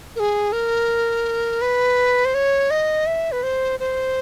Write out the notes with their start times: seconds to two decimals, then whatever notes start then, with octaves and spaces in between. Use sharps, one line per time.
0.16 A#4
0.20 G#4
0.52 A#4
1.62 B4
2.25 C5
2.34 C#5
2.71 D#5
3.06 E5
3.32 B4
3.43 C5
3.80 C5